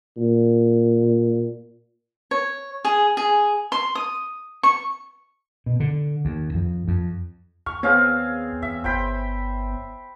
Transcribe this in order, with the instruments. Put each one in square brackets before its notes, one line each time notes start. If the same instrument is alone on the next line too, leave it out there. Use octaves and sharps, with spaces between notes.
[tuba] A#2
[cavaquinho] C#5
G#4
G#4
C6
D#6
C#6
[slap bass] B2
D3
D#2
F2
F2
[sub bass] D#2 [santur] C#6 [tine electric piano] F6
[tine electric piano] B3 C#5 [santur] C4 G#4 F5
[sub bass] E2 [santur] E5
[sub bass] G1 [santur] C5 G5 B5